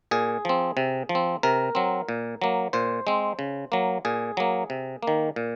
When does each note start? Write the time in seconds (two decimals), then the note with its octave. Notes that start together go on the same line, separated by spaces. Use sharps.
0.11 A#2 G#4
0.45 F3 C4
0.77 C3
1.09 F3
1.15 C4
1.43 C3 A#4
1.75 F#3 C4
2.09 A#2
2.42 F#3 A#3
2.73 A#2 C5
3.07 G#3 C4
3.39 C#3
3.72 F#3 A#3
4.05 A#2 G#4
4.37 F#3 A#3
4.70 C3
5.03 D#3 A#3
5.36 A#2